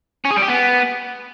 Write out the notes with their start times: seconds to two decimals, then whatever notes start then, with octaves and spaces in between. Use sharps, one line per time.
0.25 C#4
0.31 G#4
0.36 G3
0.42 G4
0.48 B3